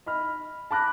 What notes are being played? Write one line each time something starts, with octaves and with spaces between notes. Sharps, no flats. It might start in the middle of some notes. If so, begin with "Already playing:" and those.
D#5 B5 F6
A5 B5 D6 F#6 A#6